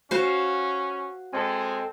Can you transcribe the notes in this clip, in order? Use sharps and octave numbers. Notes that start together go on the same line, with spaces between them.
C#4 F#4 C5 F5
G#3 C4 A4 G#5